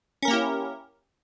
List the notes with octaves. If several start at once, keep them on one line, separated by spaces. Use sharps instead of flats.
A#3 C#4 E4 G4 A#4